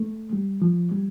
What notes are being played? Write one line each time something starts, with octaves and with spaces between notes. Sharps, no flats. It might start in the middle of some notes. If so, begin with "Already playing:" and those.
Already playing: A3
G3
F3
G3